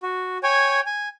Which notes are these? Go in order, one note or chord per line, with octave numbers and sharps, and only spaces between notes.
F#4
C#5 G5 G#5
G#5